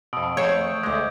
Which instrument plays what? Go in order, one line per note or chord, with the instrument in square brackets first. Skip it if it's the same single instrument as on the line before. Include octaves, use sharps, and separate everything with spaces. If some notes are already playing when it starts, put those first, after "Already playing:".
[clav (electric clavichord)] F2 B2 [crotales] D#6 E6 D7
[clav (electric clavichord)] F2 C5 [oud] D#3 A3 [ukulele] C#5 [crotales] G6
[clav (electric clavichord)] D2 G#3 [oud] C5 D#5 [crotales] D6 G6